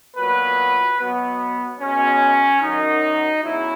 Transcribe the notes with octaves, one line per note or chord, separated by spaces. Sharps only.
A#2 F#3 B3 B4
B2 F#3 B3
B2 G#3 B3 C#4
F#2 D#3 F#3 D#4
E2 C#3 F#3 E4